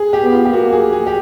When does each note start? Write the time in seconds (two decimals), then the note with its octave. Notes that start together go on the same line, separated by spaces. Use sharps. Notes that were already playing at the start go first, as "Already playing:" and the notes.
Already playing: G#4
0.13 G4
0.23 B3
0.33 F4
0.45 G4
0.53 A#3 F#4
0.73 G#4
0.93 G#4
1.07 G4